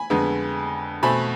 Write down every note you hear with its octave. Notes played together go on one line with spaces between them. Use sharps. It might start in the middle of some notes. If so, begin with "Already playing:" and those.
Already playing: G#5 B5
F2 D3 G#3 B3
B2 A3 C4 G#5 B5